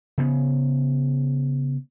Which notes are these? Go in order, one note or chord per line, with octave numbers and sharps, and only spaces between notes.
C#3 B3